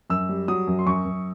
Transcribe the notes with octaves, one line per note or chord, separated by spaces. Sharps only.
F#2 E6
G3
F#3 D#6
F#2
C6
F#2 C#6
F#2